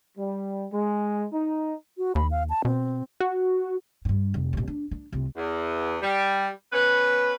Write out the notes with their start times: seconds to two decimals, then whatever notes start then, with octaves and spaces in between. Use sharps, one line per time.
0.18 G3
0.73 G#3
1.33 D#4
1.98 F#4
2.15 D#2 B5
2.31 F5
2.50 A5
2.65 B2 C4
3.20 F#4
4.05 G2 A#2
4.34 F1
4.53 D#2 A#2
4.68 D4
4.91 D4
5.12 C2 F4
5.37 E2
6.01 G3
6.72 B3 C#4 B4